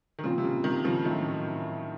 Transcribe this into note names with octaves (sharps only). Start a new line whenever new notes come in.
D#3
A#2 C#3 F3 C4 F4
C3
C#3
C3 D#3
C#3 F3
A2 D#3 F#3 A3 C4 D#4 F#4